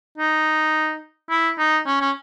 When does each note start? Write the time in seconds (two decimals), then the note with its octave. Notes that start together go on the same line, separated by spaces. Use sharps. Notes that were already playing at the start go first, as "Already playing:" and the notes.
0.18 D#4
1.30 E4
1.59 D#4
1.87 C#4
2.01 C#4